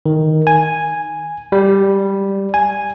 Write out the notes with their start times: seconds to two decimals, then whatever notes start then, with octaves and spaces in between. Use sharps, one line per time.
0.06 D#3
0.47 G#5
1.52 G3
2.54 G#5